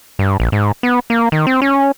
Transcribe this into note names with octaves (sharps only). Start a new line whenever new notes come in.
G2
A#1
G#2
B3
A#3
D#3
C4
C#4